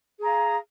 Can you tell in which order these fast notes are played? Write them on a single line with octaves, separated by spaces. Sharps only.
G#4 A#5 F5